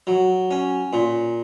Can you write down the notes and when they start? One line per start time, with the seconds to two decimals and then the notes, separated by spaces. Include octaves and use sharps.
0.07 F#3
0.51 C#4
0.93 A#2